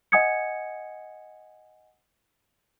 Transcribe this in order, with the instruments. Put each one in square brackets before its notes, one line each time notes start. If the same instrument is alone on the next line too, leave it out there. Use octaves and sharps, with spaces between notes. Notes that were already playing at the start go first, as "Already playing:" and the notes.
[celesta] D#5 F#5 G#5 D#6 G#6 C#7